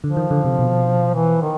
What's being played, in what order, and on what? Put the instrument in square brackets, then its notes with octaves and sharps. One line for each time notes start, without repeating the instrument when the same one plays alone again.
[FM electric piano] D3 [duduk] F3
[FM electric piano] D#3
D3
C3
B2
[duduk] E3
D#3